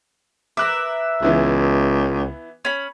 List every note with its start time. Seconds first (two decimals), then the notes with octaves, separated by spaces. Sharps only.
0.57 A#4 B4 E5 D6 F#6
1.22 C#2 E3 B3 E4
2.65 C#4 B5